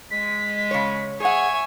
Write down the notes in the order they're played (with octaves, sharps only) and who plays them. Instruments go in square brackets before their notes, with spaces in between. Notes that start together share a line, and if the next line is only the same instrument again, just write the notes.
[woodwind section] G#3 [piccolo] B6
[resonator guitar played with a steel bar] C#3 C#5
[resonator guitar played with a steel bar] G#4 F#5 [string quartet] C#5 E5 G#5